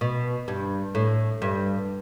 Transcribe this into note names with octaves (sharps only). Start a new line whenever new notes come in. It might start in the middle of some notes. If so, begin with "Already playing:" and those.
B2
G2
A2
G2